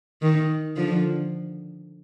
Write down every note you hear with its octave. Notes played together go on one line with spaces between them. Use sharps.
D#3
D3 F3